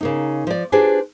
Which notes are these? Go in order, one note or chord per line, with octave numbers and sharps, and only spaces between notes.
C#3 A#3 D#4
F3 D5
D4 F4 G4 G#4 B4 C5